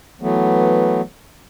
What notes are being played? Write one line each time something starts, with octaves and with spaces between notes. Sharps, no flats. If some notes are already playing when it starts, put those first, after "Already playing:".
E3 F#3 A3 B3